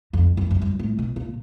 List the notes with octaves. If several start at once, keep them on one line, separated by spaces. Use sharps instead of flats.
F2
F#2
F#2
G2
A2
B2
A#2